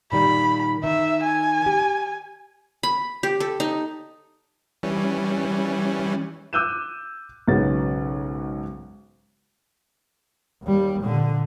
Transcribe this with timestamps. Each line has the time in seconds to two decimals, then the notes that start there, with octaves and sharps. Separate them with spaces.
0.12 A#2 D#3 G3 B5
0.84 D#3 E5
1.23 G#5
1.66 G4
2.83 B5
3.23 G4
3.40 A4
3.60 D#4
4.83 E3 G3 C#4
6.53 D6 E6 F#6 G6 D#7 E7
7.48 B1 G#2 C#3 B3 F#4 A6
10.63 D#2 G3
11.02 A#2 D3